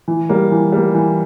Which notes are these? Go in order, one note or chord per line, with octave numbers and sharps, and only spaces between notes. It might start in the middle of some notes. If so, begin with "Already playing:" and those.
E3
G3 A#3
E3
G3 A#3
E3